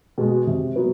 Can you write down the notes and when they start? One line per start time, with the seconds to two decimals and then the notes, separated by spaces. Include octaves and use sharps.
0.18 B2 G#3
0.47 C3
0.76 F#3 B3